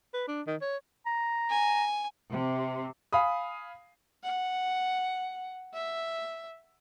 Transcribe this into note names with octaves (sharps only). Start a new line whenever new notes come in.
B4
D4
D#3
C#5
A#5
G#5
C3
F5 G#5 B5 D#6
F#5
E5